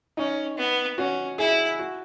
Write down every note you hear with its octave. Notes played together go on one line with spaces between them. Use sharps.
C#4 D#4
B3
C#4 F#4
E4 G#4
F#4